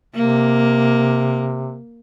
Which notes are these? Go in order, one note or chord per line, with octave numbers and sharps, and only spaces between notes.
C3 A#3